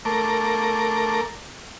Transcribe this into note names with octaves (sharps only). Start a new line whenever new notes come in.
A3 A#4 D6